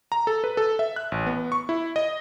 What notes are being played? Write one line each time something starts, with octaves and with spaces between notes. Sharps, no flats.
A#5
A4
B4
A4
E5
F#6
A1
B3
C#6
E4
D#5